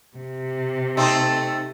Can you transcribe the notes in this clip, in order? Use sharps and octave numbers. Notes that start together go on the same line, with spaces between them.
C3
A3 C4 D#4 A4